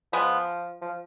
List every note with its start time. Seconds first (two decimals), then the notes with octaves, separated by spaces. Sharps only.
0.13 F3 G#3 B3
0.82 F3